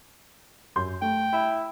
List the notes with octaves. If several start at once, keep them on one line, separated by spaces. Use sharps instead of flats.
F#2 C6 G6
A3 G5
E4 B5